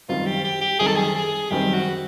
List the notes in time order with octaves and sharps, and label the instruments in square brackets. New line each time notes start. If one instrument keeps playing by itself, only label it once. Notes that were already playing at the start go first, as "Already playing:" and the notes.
[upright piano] F#2 D#3 G3 C4 [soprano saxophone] F4
[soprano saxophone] G4
G4
G4
[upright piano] F#2 D#3 G3 C4 [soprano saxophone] G#4
[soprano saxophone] A4
G#4
G#4
[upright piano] F#2 D#3 G3 C4 [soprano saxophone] G4
[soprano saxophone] F#4